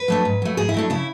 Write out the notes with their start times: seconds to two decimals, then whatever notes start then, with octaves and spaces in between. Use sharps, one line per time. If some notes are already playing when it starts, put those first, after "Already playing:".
Already playing: B4
0.08 F#3 A3 D4
0.25 G#2
0.42 F#3 A3
0.57 G#2 G#4
0.69 E4
0.74 F#3 A3 D4
0.90 C#3 E4